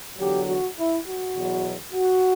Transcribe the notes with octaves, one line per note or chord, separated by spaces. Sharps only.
E2 D3 F#3 G4
F#4
E4
F#4
E2 B2 F#3
F#4